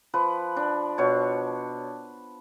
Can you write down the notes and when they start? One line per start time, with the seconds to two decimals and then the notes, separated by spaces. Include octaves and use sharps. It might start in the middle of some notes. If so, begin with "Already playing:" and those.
0.14 F3 B4
0.56 D4
0.98 B2 C#5